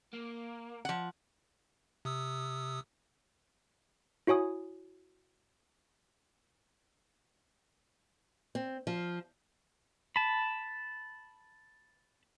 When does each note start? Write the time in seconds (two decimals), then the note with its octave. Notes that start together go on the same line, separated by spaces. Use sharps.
0.13 A#3
0.85 F3 F#5
2.05 C3 D#6 E6
4.27 E4 F#4 C#5 G#5 D#6
8.55 C4
8.87 F3
10.16 A5 B5